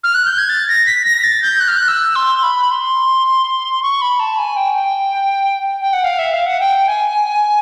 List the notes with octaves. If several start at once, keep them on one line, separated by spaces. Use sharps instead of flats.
F6
F#6
G6
G#6
A6
A#6
B6
A#6
A6
G6
F#6
F6
F#6
E6
C6
B5
C6
C#6
B5
A5
G#5
G5
G5
G5
F#5
F5
E5
F5
F#5
G5
G#5